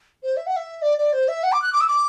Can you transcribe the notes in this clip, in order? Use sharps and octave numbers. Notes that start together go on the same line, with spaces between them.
C5
E5
F#5
E5
D5
D5
C5
E5
F#5
D6
F#6
D6
E6
D6